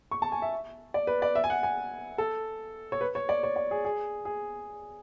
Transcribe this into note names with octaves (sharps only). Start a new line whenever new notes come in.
C#6
A5
G#5
E5
D5
B4
D5
E5
G#5
F#5
G#5
A4
C#5
B4
C#5
D5
C#5
D5
G#4
G#4
G#4